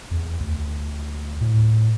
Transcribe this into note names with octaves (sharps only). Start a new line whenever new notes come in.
E2
D2
A2